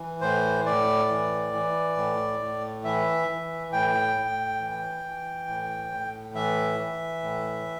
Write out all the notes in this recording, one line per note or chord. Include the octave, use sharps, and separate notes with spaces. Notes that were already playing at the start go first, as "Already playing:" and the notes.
Already playing: E3
A2 C5
A2 D5
E3
E3
A2
A2
E3 E5
E3
A2 G5
A2
E3
E3
A2
A2
E3 E5
E3
A2